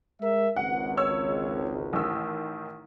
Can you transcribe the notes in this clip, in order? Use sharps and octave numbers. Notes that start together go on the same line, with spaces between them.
G#3 A#4 E5
G#1 C#2 F#5
C#5 E6
A1 D#3 E6